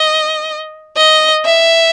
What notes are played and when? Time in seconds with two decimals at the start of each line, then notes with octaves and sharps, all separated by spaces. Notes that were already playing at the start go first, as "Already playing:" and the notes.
Already playing: D#5
0.97 D#5
1.45 E5